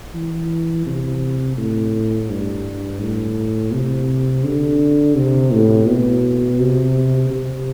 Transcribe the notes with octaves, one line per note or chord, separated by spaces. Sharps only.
E3
C3
A2
G2
A2
C3
D3
C3
A2
B2
C3
C3